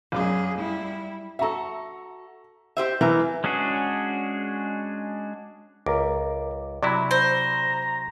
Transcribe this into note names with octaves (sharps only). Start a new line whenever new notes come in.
A#1 F#2 F#3 G#4 D6
G3 E4
F#4 A4 E5 A#5
G4 C5 E5
E3 A#4
G#3 C#4 D4 F#4 G#4
C#2 A#4 D6
C3 F#3 E4 D5 B5
C5 A#5